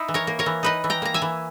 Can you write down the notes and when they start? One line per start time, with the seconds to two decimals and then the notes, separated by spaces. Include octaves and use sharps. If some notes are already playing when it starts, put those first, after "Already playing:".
Already playing: D#4 E4
0.08 E3
0.14 A#4 C#5
0.27 A#3
0.39 A#4 C#5
0.46 E3
0.63 D#4 B4 D#5
0.84 E3
0.90 G5 A#5
1.02 A#3 A#5
1.14 E5 G#5
1.22 E3